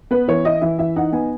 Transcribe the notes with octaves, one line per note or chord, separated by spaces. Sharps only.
B3 B4
E3 C#5
E4 D#5
E3 E5
E3 E5
D#4 F#5
B3 G#5